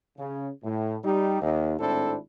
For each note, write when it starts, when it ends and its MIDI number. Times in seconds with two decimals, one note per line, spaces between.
0.18 0.49 49
0.64 0.96 45
1.04 1.39 55
1.04 1.39 63
1.04 1.39 67
1.41 1.74 39
1.79 2.16 32
1.79 2.16 45
1.79 2.16 60
1.79 2.16 62
1.79 2.16 64
1.79 2.16 69